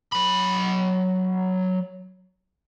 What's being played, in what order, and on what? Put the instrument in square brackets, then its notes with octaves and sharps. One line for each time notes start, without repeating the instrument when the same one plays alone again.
[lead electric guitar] F#3 B5